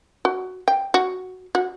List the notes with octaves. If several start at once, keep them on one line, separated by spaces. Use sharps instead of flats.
F#4
G5
F#4
F#4